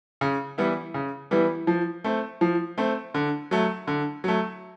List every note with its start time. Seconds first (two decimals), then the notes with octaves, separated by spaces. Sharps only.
0.21 C#3
0.58 E3 G3 B3 E4
0.94 C#3
1.31 E3 G3 B3 E4
1.67 F3
2.04 A3 C4
2.41 F3
2.78 A3 C4
3.14 D3
3.51 F#3 A3
3.87 D3
4.24 F#3 A3